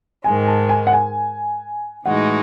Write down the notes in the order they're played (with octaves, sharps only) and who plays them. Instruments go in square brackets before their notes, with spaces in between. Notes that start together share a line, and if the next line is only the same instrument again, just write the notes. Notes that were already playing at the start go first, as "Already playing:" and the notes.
[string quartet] G#2 D#3 G#3 [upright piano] G#5
[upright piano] A5
G#5
F#5
G#5
[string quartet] A2 E3 G#3 D#4 F#4 [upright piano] F#5